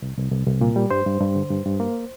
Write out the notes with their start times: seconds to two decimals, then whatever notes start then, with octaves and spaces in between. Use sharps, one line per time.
0.02 C2
0.17 C2
0.32 C2
0.47 C2
0.61 A#2
0.76 G3
0.91 G2 C5
1.06 G2
1.21 G2
1.35 D3
1.51 G2
1.66 G2
1.80 A#3